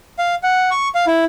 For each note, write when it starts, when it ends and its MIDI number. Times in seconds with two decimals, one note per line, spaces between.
0.19 0.35 77
0.43 0.70 78
0.71 0.89 85
0.95 1.05 77
1.07 1.25 64